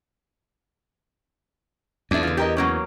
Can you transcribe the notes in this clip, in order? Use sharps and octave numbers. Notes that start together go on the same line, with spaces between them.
E2 D4 E5
D3 F4
G4 A#4 D#5
F#3 A#3 C#4